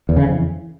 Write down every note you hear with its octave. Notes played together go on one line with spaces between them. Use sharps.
E2
C#3
F2
E3